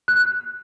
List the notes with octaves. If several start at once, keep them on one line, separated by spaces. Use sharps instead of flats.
F#6